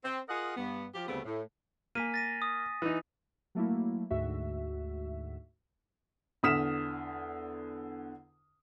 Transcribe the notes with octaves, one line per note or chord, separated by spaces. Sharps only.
C4
F4 G#4 A#4 D#5 F#5
G2 B3
F3 G4
D2 C#3 G3 A3 B3 C4
A2
A#3 G#5 B6 D#7
A6 A#6 D#7
D#6
E3 D#4
F#3 A3 A#3 E4
D2 G#2 F#4 E5
E2 D3 D#6 F6 B6 E7